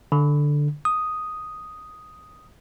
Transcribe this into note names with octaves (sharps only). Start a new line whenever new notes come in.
D3
D#6